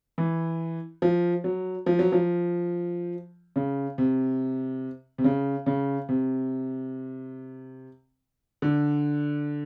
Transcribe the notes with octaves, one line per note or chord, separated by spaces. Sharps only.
E3
F3
F#3
F3
F#3
F3
C#3
C3
C3
C#3
C#3
C3
D3